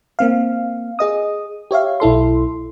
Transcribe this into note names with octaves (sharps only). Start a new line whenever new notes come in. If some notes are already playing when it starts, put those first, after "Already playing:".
A#3 C4 F5
G#4 D#5 D#6
G4 C#5 E5 F5
B1 E4 A4 C6